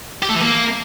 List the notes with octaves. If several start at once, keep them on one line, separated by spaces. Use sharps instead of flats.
G4
A3
E3
A#3